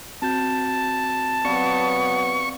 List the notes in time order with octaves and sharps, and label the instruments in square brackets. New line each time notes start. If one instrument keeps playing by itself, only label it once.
[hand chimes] C4 F#4 G6 [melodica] A5
[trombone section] F#3 B3 [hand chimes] C4 D5 F5 [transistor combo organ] C#6